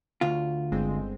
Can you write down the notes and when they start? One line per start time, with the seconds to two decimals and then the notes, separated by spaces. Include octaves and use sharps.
0.21 D2 F4
0.71 G1 G#3 C4